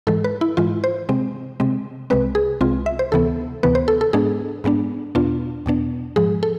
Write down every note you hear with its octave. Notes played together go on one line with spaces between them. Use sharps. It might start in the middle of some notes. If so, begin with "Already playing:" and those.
G#2 E3 G#3 A4
B4
E4
G#2 E3 G#3 F4
C5
C3 G#3 C4
C3 G#3 C4
C2 C3 G#3 C4 B4
G#4
C2 C3 G#3 C4 F4
E5
C5
D2 C3 E3 B3 A4
D2 C3 E3 B3 B4
C5
A4
A4
G#2 G#3 B3 D4 G#4
G#2 G#3 B3 D4
E2 B2 B3 D4 F4
E2 B2 B3 D4
G#2 F3 G#3 G#4
A4